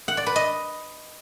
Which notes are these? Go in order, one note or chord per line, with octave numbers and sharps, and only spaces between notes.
F#5
D5
B4
D#5